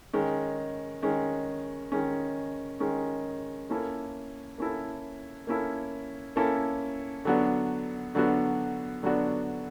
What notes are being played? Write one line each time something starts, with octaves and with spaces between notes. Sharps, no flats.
D#3 G#3 C#4
D#3 G#3 C#4
D#3 G#3 C#4
D#3 G#3 C#4
A#3 C#4 E4 A4
A#3 C#4 E4 A4
A#3 C#4 E4 A4
A#3 C#4 E4 A4
D3 F#3 B3 D4 F#4
D3 F#3 B3 D4 F#4
D3 F#3 B3 D4 F#4